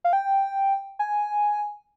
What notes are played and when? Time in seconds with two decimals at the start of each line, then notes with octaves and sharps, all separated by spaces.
0.04 F5
0.13 G5
0.99 G#5